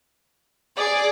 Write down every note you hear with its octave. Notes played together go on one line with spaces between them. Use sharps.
G#4 D5